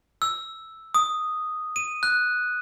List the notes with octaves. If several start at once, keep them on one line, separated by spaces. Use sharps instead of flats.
E6
D#6
D#7
F#6